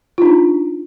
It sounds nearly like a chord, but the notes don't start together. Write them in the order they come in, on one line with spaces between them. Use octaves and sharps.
F4 D#4 D4